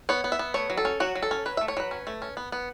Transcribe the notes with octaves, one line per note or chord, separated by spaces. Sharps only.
B3 C#5
B3
E5
B3
A3 C#5
F#3
A4
C#4
F#3 F#4
F#3
A4
C#4
F#3 B4
A3 E5
C#5
F#3 B4
C#4
A3
C#4
B3
B3